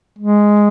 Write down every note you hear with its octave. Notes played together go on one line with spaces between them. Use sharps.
G#3